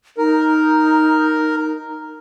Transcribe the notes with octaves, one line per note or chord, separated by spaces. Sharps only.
D#4 A#4